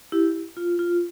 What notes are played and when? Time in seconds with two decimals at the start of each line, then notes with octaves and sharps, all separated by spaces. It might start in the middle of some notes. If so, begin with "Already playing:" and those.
0.12 E4 G4
0.57 F4
0.79 F4